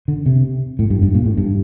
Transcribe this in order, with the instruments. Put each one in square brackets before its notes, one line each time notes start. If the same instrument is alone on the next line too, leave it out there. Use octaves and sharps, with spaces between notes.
[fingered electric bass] D3
C3
A2
G2
G2
A#2
A2
G2